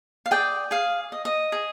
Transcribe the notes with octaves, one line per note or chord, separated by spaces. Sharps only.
F5
G#4 D5 G5
G#4 F5
D#5
D#5
G#4